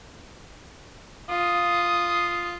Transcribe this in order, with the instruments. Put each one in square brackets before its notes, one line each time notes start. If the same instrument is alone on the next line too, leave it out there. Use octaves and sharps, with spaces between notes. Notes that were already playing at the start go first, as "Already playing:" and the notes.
[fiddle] F4 [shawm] D#6